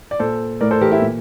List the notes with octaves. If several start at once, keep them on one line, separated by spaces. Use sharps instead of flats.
D5
A#2 A4 C5
A2 A#4 D5
A4 C5
E3 G4 A#4
E4 G4
A#2